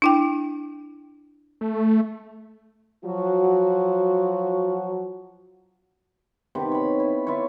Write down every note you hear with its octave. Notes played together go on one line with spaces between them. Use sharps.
D4 E4 G5
A3
F3 F#3 F4 F#4
C3 D#3 B3 B4
C#5 B5
E4
E4 F4 B4 C#5